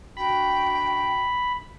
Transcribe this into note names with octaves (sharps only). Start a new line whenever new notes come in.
B2 D4 F#4 G5 B5